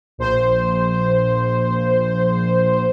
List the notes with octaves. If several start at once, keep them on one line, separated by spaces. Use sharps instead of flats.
A#1 C5